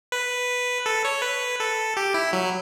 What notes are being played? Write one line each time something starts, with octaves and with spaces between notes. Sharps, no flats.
B4
A4
C#5
B4
A4
G4
E4
F#3